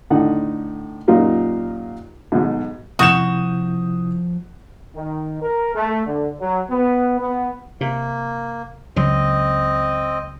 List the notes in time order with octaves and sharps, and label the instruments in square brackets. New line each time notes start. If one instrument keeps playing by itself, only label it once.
[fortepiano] A2 D3 D#4 F#5
F#2 A#2 D#4 F4 G4 A#4
B1 G#2
[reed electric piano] C3 E4 G6 [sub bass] F3 [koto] F#4 [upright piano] D#6 E7
[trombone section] D#3
A#4
A3
D3
F#3
B3
B3
[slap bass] C3 [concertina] A#3
[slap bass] C#2 F#3 [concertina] C4 D#5